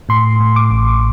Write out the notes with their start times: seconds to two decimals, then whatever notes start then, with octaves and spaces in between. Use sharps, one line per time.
0.09 A2 C6
0.40 A2
0.56 D6
0.71 A1